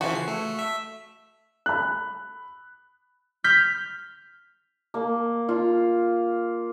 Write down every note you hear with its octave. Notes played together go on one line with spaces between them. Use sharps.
C#3 E3 F3 F#4
C7
A3
E5
B5 F#6
F6 G6 B6
A#3
F4